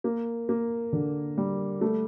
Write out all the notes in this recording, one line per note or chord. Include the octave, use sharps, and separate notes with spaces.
A#3
A#3
D3
G3
A3